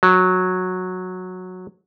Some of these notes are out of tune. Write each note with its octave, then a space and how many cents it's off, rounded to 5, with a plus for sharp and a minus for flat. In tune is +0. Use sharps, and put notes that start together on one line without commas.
F#3 -10